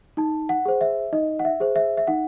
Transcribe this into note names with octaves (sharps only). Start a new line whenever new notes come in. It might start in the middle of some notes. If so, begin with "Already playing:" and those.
D#4 A5
F#5
G#4 C5
E5
D#4 D#5
F#5
E5
G#4 C5
E5
E5
D#4 F#5